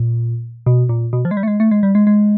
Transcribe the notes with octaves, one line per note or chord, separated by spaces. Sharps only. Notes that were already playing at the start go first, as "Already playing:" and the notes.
Already playing: A#2
B2
A#2
B2
F3
G#3
G3
A3
G#3
A3
G#3
G3
G#3
G#3